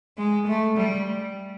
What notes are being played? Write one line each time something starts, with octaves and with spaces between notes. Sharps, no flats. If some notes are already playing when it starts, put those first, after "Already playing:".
G#3
A3
G3